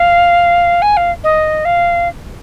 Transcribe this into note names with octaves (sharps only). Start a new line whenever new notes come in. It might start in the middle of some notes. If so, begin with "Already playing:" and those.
Already playing: F5
G#5
F5
D#5
F5